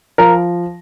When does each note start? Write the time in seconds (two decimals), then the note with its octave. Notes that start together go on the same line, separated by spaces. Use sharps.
0.18 F3 A#4